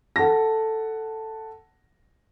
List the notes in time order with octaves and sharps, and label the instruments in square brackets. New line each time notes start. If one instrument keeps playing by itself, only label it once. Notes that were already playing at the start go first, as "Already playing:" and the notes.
[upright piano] A4 F#5 A5 A#6